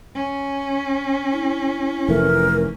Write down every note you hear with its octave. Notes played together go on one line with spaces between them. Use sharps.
C#4
E4
F1 E3 A3 A#4